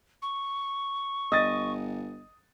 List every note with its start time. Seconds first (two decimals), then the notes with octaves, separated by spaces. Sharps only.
0.22 C#6
1.32 G1 D#5 D#6 A6